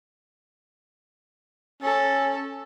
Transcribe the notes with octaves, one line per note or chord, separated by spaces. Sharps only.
C#4 A4